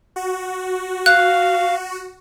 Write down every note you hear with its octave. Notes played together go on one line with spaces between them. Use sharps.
F#4
F5 F#6